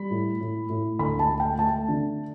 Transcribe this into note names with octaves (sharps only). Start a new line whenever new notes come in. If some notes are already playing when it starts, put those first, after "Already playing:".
Already playing: G3 B5
A2
A2
A2
D2 B5
A5
A3
G5
A3 A5
D3